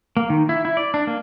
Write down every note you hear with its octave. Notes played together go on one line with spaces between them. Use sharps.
A#3
D#3
E4
E4
D5
D4
A#3